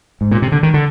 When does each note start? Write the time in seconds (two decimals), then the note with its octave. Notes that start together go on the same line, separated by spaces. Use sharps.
0.21 G#2
0.31 A#2
0.42 C3
0.52 D3
0.63 D#3
0.74 D3